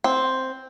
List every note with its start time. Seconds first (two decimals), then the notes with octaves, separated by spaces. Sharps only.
0.04 C4